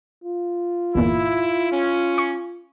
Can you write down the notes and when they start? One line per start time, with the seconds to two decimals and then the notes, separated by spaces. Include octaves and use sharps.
0.24 F4
0.95 G1 E2 A#2 E4
1.70 C#4
2.18 C#6